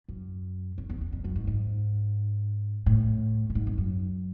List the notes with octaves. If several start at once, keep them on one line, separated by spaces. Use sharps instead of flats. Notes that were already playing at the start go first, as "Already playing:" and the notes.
F#2
F2
E2
E2
F2
F#2
G#2
G#2
A2
A2
G#2
F2
F#2